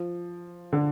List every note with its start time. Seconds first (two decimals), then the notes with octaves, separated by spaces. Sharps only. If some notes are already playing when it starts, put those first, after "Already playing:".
Already playing: F3
0.73 D3